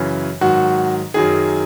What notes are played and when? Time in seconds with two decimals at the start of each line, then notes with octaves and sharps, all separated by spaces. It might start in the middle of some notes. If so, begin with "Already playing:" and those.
Already playing: F#2 C#3 E3
0.41 G#2 D#3 F#3 F#4
1.14 F#2 D#3 F#3 G#4